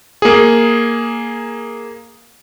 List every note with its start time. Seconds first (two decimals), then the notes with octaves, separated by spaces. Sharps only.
0.22 A#3 G#4